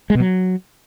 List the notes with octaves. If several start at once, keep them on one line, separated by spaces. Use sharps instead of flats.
G#3
B2
F#3